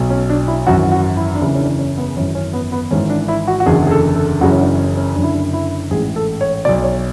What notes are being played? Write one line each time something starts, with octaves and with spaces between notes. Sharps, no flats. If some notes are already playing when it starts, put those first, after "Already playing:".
Already playing: B1 B2
C#4
D4
E4
G#1 F#2 E3 F#4
F#4
E4
D4
F#1 E2 C#3 E3 E4
C#4
D4
C#4
B3
G#1 F#2 E3 C#4
C#4
B3
B3
G#1 G#2 E3 C#4
D4
E4
F#4
F#4
F#1 E2 D3 G#4
G#4
A4
A4
F#1 F#2 C#3 E3 F#4
C#4
D4
C#4
C#4
F#1 F#2 D3 D4
E4
D4
E4
A1 G#2 E3 G#4
A4
C#5
B1 B2 D5
C#5